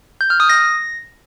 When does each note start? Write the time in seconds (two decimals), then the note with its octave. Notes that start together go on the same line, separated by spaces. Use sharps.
0.21 G6
0.30 F6
0.40 D#6
0.50 A#6